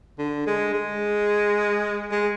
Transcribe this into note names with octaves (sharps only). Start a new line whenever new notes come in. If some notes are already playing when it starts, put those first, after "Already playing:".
D3
G#3
G#3
G#3